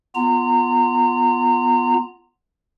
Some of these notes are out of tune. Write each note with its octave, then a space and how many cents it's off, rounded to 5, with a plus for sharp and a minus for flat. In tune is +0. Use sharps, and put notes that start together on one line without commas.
B3 +0 F4 -10 A#5 -25